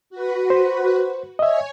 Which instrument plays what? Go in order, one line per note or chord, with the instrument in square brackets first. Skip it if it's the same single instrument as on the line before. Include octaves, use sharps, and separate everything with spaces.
[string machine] F#4 B4
[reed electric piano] C5
[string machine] C#5 G#5 [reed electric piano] D#5 E5